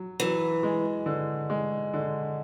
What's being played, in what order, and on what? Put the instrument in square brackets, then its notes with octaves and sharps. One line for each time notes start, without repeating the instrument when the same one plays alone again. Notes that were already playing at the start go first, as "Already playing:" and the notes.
Already playing: [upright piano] F#3
[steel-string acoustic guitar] E3 [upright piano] F#3
[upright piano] G#3
D3
G#3
D3